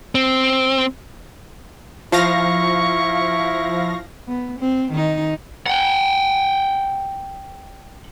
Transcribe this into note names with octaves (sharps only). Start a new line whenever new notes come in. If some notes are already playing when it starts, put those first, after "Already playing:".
C4
F3 E4 F5 C#6 A#6
B3
C4
D#3 D#4
F#5 G5